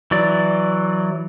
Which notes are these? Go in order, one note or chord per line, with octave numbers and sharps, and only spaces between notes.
E3 F#3 D5